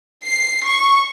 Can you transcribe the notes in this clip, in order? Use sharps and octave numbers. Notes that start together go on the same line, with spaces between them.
C7
C#6